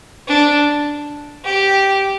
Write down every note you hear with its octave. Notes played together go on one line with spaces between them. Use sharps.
D4
G4